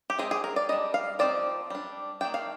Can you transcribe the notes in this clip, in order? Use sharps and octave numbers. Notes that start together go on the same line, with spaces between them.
G4
G#3 C4 D#4 G#4
G#4
A#4
D5
G3 D4 D#5
F5
F3 C4 D#4 D5
G3 D4
D#3 A#3 D4 G5
F5